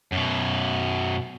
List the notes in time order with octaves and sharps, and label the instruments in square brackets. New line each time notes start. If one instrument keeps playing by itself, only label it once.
[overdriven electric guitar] F#2 B2